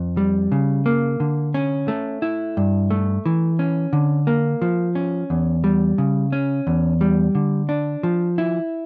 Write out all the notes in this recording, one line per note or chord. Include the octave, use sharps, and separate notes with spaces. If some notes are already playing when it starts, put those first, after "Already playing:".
Already playing: F2
G3
C#3
A#3
D3
C#4
A3
E4
G2
A3
E3
C#4
D3
A#3
F3
C#4
E2
G3
C#3
C#4
E2
G3
D3
D4
F3
E4